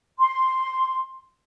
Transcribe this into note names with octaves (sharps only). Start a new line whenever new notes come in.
C6